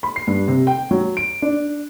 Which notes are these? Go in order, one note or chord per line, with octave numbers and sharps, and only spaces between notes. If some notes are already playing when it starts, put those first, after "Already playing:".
B5
C7
G2
C3
G5
F#3
D7
D4